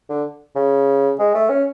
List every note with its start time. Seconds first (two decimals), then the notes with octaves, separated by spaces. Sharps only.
0.09 D3
0.56 C#3
1.19 G#3
1.34 A3
1.50 C#4